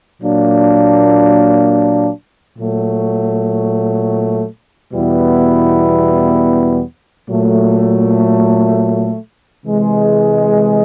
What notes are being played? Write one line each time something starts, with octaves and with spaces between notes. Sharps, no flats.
A#2 F#3 A#3 D4
A#2 F#3 A3
E2 B2 G3 B3 E4
A#2 F#3 A3
C3 E3 G#3